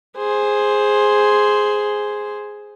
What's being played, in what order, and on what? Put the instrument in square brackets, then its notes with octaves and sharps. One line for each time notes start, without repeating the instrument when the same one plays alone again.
[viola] G#4 C5